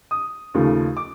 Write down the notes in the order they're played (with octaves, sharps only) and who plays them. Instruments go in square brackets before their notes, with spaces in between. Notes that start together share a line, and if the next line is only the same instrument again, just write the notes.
[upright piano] D#6
D#2 C#3 F3 A3
D6